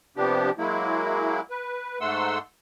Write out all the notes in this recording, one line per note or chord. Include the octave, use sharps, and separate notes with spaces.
C3 F3 B3 D4 G4
F#3 G#3 A#3 E4
B4
G#2 A3 F#5 C6 E6